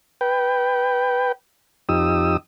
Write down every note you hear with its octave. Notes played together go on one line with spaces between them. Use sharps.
B4 G5
F2 D#4 G4 D#6 E6